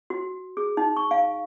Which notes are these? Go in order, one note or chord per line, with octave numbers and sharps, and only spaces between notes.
F#4
G#4
D#4
C#6
F5